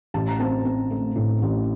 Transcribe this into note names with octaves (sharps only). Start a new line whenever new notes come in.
A1 A5
A#5
C4 A5
C4
A3
A2
A1